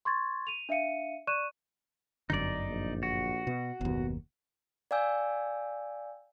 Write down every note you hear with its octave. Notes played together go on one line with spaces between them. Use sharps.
C6 C#6 G#6 A6
D#7 F7
D4 E5 F5 C#7 D#7
D5 C#6 F#6 D#7 E7
G1 F#2 D3 D#4 D5
A#1
F#4
B2
F#1 D#2 B2
D5 F5 G5 G#5 E6 G6